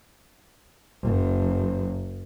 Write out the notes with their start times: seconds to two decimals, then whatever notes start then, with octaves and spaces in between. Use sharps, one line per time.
1.02 F#1 F#2